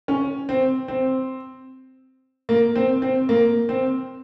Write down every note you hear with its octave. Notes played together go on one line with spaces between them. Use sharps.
C#4
C4
C4
A#3
C4
C4
A#3
C4